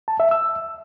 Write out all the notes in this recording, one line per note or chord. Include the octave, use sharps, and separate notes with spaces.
A5
E5
E6